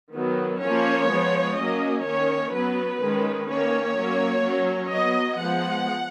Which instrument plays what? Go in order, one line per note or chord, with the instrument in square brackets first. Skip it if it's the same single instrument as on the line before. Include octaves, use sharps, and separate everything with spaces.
[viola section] D#3 F#3 B3
F3 A#3 C#4 C#5
F3 G#3 B3
F#3 A#3 C#4 D#5
D#3 A#3 C#4 C#5
F#3 B3 B4
D#3 G#3 C#4
D#3 A#3 C#4 C#5
F#3 A#3 C#4
F#3 C#4
F#3 B3 D#5
F3 G#3 B3 F#5